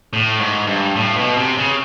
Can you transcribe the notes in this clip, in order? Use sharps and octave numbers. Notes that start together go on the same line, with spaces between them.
A2
G#2
G2
A2
B2
C3
C#3